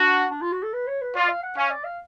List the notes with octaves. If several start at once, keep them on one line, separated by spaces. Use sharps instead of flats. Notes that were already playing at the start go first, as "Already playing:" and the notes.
Already playing: D4 F#4
D4
F4
F#4
A4
B4
C#5
B4
F4 D5
F5
F#5
C#4 F5
D5
F5